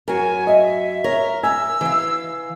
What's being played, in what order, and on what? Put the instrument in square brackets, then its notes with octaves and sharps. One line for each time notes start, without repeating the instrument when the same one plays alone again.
[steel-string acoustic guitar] F#2 F#4 [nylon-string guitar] A#4 [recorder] G#5
[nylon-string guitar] D#5 [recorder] E5
[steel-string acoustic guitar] A#4 [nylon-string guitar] C#5
[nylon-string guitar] G#5 [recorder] E6
[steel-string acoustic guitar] E3 F5 [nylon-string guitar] E4